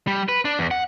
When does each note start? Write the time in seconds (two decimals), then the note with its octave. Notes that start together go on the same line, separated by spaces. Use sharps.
0.07 G3
0.29 B4
0.45 D4
0.59 E2
0.71 F#5